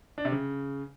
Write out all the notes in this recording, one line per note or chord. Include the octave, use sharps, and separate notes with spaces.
D4
C3
C#3